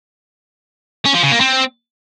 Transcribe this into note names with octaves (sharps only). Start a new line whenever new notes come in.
C#4
F3
C#3
A#3
C4